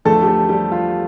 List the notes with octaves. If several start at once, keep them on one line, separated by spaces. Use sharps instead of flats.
E2 D3 F3 A3 A4
G4
A3 A4
G3 G4
F4